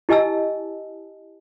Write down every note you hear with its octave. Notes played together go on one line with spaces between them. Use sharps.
E4 G4 D#5 G#5 A5 E6